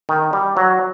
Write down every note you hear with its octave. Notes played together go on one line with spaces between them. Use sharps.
D#3
G3
F#3